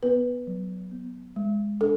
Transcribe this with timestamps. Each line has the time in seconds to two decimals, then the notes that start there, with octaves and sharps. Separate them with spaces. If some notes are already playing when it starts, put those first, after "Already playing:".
0.03 B3 B4
0.47 F#3
0.91 B3
1.36 G#3
1.80 D4 A4